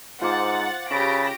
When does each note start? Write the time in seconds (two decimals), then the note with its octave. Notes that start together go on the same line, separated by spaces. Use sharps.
0.21 G#2 F4 C5 F#5 D6 A6
0.91 C#3 G4 A5 B5 C#6 A#6 D7